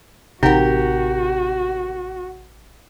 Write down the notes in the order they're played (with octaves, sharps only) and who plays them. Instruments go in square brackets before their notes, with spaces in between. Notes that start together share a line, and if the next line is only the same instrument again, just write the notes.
[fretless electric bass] A1 C3 [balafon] D#4 F#5 [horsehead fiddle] F#4 [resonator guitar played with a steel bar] G4 A#4